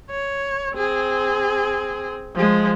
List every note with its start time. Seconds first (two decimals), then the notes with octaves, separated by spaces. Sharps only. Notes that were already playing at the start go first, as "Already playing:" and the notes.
0.10 C#5
0.75 C4 G#4
2.36 F3 G#3